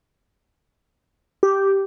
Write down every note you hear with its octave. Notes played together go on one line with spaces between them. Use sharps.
G4